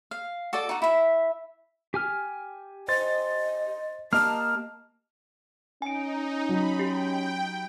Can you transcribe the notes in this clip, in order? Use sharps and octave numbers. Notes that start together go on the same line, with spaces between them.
F5
F#4 A4 D5 D#5
D#4 F#4
E4 E5
G4 G#5 F6
C5 D#5 C6 A6
A#3 G4 D#5 A5 F6
C#4 D#4 G#5 D7
F#3 B5
G4 G5